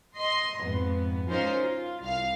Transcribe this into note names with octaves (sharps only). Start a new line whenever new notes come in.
D#5 C6
F2 G#2 B3
C#4 D#4 F4 A#4 C5
F4
C2 F5